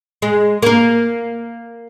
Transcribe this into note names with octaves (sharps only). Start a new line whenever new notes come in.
G#3
A#3 A#4